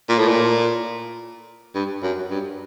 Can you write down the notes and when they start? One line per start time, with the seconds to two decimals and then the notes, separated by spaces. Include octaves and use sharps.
0.09 A#2
0.19 A2
0.29 A#2
1.75 G2
2.03 F#2
2.30 G2